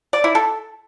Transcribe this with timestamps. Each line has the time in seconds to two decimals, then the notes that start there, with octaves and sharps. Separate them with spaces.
0.13 D5
0.24 E4
0.35 A4